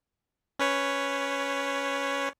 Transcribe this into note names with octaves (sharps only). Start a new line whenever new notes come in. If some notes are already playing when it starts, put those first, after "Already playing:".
C#4 B4 C#5